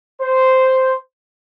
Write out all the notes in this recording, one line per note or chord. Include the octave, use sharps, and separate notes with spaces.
C5